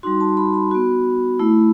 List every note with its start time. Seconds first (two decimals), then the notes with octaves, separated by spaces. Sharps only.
0.03 G3 D#4 F#4 C6
0.20 A5
0.37 B5
0.54 B5
0.71 B3 F#4
1.39 A3 E4